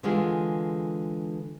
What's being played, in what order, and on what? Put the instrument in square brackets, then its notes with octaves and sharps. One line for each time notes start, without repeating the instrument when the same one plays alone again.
[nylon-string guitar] D3 E3 G#3 F4 G#4